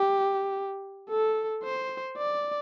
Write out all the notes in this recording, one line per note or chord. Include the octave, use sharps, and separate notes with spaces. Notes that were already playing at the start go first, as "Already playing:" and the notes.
Already playing: G4
A4
C5
D5